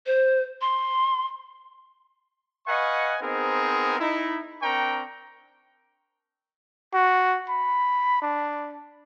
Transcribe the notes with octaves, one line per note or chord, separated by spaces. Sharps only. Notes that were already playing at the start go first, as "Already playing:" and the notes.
C5
C6
B4 D#5 F5 F#5 G#5 C#6
B3 C4 D#4 G#4 A#4 C5
D#4 E4
C4 D4 A#4 G5 A#5 C#6
F#4
B5
D4